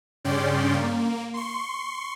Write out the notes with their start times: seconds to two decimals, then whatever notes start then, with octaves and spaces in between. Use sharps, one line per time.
0.24 G2 C#3 C#4 D5 G5 C6
0.73 A#3
1.34 C6 C#6